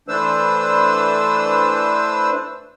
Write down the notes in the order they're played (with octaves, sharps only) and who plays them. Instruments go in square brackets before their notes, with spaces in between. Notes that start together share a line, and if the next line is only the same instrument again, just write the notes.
[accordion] E3 A3 D4 B4 C5 E6